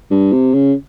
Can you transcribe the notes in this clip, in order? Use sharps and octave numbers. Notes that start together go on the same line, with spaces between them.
G2
C3
C#3